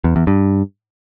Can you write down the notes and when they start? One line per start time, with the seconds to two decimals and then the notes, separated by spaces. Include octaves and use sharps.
0.04 E2
0.16 E2
0.27 G2